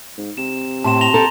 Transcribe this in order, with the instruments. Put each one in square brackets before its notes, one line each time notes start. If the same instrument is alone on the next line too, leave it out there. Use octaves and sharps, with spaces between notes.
[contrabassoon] G#2
[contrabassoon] C3 [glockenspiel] E7
[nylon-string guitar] A2 [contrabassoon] C3 [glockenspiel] A5 C6 E7
[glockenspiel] A#6 F7 G7
[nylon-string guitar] G4 A4 [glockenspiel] A#5